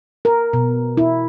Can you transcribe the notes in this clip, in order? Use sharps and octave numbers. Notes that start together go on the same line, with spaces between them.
A#4
B2
E4